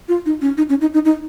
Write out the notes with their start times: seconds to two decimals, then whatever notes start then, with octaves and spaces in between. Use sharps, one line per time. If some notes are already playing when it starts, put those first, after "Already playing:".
0.09 F4
0.26 D#4
0.41 C#4
0.57 D#4
0.69 C#4
0.81 D#4
0.94 D#4
1.05 D#4